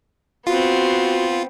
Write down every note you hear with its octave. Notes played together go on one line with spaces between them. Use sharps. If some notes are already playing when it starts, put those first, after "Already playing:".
B3 C4 F4 F#4